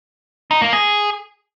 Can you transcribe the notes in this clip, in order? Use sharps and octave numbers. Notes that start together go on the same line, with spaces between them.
D#4
A#3
G#4